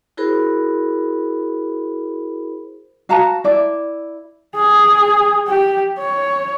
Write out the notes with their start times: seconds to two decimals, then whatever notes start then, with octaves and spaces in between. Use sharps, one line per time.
0.17 E4 F#4 G#4 A#4 C5 B5
3.09 F#4 F5 A5 A#5
3.44 E4 D5
4.57 G#4
5.48 G4
5.98 C#5